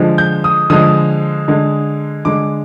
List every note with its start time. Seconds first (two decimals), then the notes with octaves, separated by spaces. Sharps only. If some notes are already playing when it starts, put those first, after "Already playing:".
Already playing: D3 F3 G#3
0.18 G6
0.44 D#6
0.70 D3 F3 G#3 D#6
1.48 D3 G#3
2.25 D3 G#3 D6